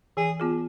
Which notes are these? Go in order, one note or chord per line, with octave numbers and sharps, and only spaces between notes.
E3 G#4
B3 F4 G#4